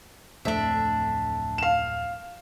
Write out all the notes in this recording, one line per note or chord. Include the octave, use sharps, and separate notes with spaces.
D1 F2 A3 D4 E5
F5 E7